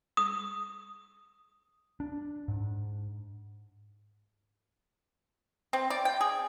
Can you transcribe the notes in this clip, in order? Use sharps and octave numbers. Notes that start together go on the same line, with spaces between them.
D#6
D4
G#2
C4
D5
G5
G#4